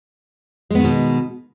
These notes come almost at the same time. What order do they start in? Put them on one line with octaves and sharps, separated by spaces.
G#3 B3 D#3 B2